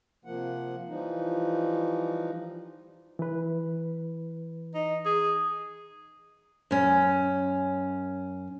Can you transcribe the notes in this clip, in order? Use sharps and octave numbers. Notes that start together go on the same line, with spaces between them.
C3 F3 A#3 F#5
E3 F3 G3 D#4
E3 B4
D#4
G#4
F#2 C#4